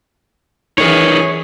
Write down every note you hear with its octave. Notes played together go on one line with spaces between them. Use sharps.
E3 D#4 G#4 A#4 B4 C#5